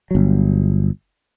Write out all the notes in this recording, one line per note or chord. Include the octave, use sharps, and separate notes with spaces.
G1 F#3